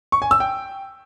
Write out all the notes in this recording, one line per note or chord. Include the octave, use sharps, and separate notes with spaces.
C#6
G#5
E6
G5